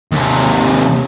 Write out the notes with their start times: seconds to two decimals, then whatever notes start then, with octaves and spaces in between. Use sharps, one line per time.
0.12 D#2 C3